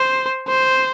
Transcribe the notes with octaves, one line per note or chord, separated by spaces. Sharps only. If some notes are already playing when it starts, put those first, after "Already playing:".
Already playing: C5
C5